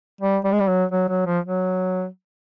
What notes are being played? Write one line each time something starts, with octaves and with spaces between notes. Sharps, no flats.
G3
G3
G#3
G3
F#3
F#3
F#3
F3
F#3